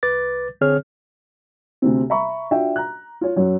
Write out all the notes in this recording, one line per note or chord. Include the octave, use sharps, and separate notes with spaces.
C2 B4 D6 A6
D3 C4 G#4 C#5 F6
D2 C3 C4
E5 A#5 B5 C#6
D4 F4 F#4 E5 G5
A#5 F#6
F4 C#5
F#2 F#3 C#5